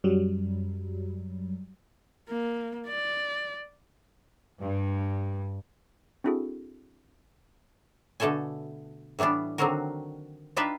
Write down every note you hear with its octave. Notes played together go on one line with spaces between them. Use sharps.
F#2 F#3 G3
A#3
D5
G2
C4 D4 E4 F#4 G#4 A4
B2 D3 A3 A4 G#5
A2 E3 G3 B3 D4
D3 D#3 F#3 C4 F#4 A#4
D4 D#4 F4 G4 B4 E5